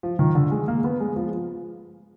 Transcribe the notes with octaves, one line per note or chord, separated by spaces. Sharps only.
F3
D#3
D3
G#3
A#3
B3
G#3
F3